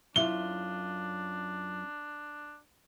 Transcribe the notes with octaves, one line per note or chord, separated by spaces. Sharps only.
F#2 D4 E4 F4 E5 G7